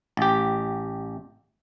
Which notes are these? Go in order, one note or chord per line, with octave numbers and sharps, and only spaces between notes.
A1 G4